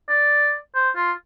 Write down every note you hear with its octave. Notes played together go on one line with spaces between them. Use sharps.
D5
C5
F4